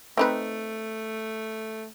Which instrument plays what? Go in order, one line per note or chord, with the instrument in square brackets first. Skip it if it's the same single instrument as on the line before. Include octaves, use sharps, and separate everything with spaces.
[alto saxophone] A3 [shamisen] C4 D#4 B4